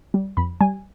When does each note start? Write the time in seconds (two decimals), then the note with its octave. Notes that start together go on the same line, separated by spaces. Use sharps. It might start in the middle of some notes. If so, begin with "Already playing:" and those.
0.14 G3
0.37 F2 B5
0.61 G3 G#5